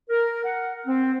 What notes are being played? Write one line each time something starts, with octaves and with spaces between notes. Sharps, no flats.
A#4
F#5
C4